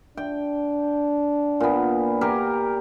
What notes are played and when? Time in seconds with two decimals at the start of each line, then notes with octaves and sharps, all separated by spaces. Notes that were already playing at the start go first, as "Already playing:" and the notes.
0.17 D4 G5
1.60 A#2 B3
2.21 G4 A#4 G#5